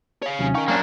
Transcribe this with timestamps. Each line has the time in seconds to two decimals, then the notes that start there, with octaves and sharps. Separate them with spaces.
0.23 C#5 F5
0.39 D#2 C3 F#3 C#4
0.55 D#4 A#4 F5 G5 C#6
0.68 F#3 A#3 D4